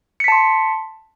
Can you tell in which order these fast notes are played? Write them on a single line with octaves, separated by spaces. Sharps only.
C#7 B6 A5 C6